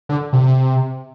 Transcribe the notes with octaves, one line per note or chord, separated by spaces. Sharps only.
D3
C3